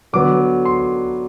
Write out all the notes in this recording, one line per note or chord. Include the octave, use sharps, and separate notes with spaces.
D3 F#3 B3 D6
C6